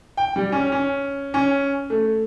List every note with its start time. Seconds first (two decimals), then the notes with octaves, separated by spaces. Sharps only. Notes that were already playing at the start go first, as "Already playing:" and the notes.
0.17 G5
0.36 G3
0.52 C#4
0.72 C#4
1.34 C#4
1.90 A3